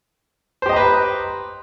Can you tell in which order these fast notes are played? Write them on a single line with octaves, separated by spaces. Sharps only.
C5 G4 D#5 A#5 B4